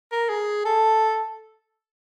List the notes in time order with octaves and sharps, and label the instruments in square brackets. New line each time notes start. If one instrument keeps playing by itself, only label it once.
[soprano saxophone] A#4
G#4
A4